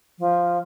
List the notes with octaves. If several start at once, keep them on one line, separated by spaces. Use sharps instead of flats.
F3